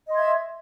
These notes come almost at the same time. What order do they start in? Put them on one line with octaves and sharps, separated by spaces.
D#5 C6 G#6 E5